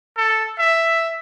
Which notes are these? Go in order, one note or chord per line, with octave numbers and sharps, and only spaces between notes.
A4
E5